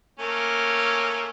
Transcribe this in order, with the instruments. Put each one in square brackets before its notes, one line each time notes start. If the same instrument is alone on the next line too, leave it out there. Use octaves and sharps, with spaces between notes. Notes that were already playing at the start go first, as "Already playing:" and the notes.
[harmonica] A3 A#3 C#4